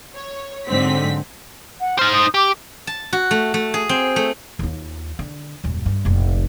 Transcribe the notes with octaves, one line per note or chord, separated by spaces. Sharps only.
C#5
G#2 D3 F#3 C4 B6
F#5
D#4 C5 F6
D#6
G4 D6
A5
F#4
A3
A3
G#4
C4
A3
D#2 F4
D3
D#1 F#2
G2
F1 A#1